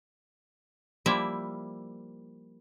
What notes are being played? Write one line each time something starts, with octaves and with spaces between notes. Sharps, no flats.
F3 G3 A#3 E4 E5